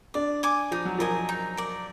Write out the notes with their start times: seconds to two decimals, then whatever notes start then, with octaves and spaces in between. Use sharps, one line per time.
0.14 D4 D5
0.43 G#5 D6
0.71 F3 D#4
0.85 F#3
0.99 F3 A#4 D#5 G#5
1.29 D#4
1.57 A#4 D5